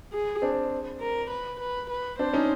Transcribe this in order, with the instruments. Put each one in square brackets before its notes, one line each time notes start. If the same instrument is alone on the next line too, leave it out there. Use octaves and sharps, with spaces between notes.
[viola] G#4
[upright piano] C4 D4
[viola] A#4
B4
B4
B4
[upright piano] C4 D4 [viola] C5
[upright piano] C#4 D#4